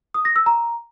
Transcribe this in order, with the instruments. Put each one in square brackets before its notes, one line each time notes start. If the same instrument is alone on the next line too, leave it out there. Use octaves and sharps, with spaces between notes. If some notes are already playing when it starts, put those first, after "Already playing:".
[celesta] D#6
A#6
E6
A#5